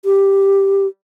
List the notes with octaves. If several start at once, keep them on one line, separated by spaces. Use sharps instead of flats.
G4